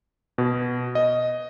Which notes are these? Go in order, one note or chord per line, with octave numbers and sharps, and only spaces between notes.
B2
D#5